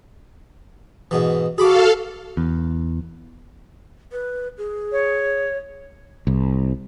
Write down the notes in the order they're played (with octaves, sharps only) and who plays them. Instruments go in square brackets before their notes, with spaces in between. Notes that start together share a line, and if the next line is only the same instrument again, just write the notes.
[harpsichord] G#2 B2 E3
[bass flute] F#4 [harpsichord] G#4 B5 D6 [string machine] A4 F5
[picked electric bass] E2
[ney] B4
G#4
[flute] C#5
[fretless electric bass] C2